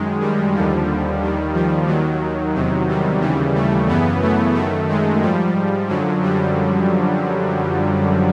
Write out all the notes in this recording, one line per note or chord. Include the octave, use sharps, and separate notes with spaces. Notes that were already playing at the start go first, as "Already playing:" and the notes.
Already playing: F#2 D#3 G#3
G3
D#2 D3 F3
D#2 D#3
F3
D#2 D#3 F#3
E2 C3 D#3
G3
D#2 C#3 E3 G3
A3
F#2 C#3 E3 B3
A3
F#2 D#3 A3
G#3
G#2 F3 G3
F#2 D3 F3 F#3
G3